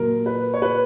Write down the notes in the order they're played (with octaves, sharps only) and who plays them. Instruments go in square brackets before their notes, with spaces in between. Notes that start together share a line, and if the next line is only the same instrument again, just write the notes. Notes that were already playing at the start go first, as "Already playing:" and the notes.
Already playing: [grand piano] A#2 F#3 A#3 A#4
B4
C#5
B4